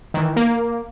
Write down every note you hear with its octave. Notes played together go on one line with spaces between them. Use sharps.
D#3 E3
A#3